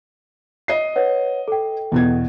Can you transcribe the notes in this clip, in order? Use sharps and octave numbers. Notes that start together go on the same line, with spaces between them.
D#5 C7
B4 C#5 F#5
A4 G5
E2 B2 G#6